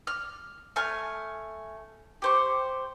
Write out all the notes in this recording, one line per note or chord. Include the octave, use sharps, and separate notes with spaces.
F6
A3 G#5 F6
G4 C5 C#6